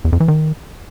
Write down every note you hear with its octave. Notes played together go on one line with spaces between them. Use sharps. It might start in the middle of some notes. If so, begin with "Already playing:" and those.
E2
F2
E3
D#3